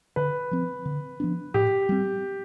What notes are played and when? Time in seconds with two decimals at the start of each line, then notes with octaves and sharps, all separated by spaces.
0.16 D3 B4
0.51 F3 C4
0.85 D3
1.20 F3 B3 D4
1.54 A2 G4
1.89 G3 C4